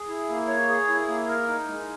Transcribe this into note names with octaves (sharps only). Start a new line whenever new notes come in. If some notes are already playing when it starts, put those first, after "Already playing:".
Already playing: G#4
E4
A#3
C#5
G#4
E4
A#3
A#4
D#4
G#3